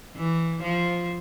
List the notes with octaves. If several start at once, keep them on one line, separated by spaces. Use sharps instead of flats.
E3
F3